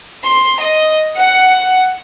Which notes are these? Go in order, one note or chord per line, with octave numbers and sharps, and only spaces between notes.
C6
D#5
F#5